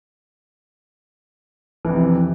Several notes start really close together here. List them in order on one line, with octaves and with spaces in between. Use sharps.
E3 F2 C3